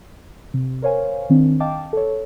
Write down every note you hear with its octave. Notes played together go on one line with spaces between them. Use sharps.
C3
A#4 C5 C#5 F5 G#5
D#3 C4 D4
D#5 F5 G5 A5 D6
A4 C#5